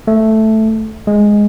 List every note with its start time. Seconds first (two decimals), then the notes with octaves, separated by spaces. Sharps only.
0.07 A3
1.07 G#3